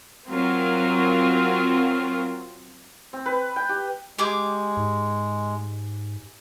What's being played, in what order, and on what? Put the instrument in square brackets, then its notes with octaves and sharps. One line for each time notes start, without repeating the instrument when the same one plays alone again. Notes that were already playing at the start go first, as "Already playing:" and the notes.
[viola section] F#3 C4 F4 A#4
[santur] C4
B4
G5
G4
[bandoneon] G#3 [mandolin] G4 G#4 D6
[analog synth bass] G#2